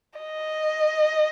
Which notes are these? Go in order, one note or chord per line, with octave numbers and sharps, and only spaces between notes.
D#5